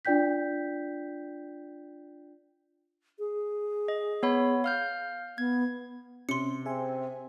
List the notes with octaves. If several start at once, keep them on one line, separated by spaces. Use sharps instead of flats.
D4 F4 D5 G5 G6 B6
G#4
D#5
B3 C#5 B5
F5 F6 G6
B3 G#6
C3 C#4 C6 C#7
C4 G#4 E5 G#5